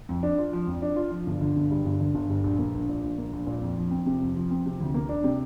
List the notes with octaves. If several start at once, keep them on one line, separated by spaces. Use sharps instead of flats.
F2
D4
F4
F3
F2
D4
F4
F3
G1
D3
G1
G2
G1
D3
G1
G2
A#1
A#3
A#1
A#2
A#1
A#3
A#1
A#2
F2
F3
C4
C3
F2
F3
C4
C3
D2
A#3
D4
C3